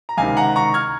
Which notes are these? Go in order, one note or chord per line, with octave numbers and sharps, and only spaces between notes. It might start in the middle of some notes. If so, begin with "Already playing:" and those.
A#5
C#2 C3 D#3 F5 G#5
F#5 A#5
A#5 C#6
F6 G#6